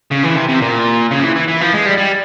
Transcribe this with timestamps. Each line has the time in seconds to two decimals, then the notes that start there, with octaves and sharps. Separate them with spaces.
0.12 C#3
0.24 E3
0.36 C3
0.49 C3
0.61 A#2
1.11 C#3
1.19 F3
1.24 E3
1.36 E3
1.48 E3
1.61 F3
1.74 G#3
1.86 G3
1.98 G3